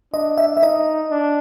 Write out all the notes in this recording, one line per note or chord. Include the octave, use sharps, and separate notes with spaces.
D4 D#5
E5
E5
D#4 D#5
D4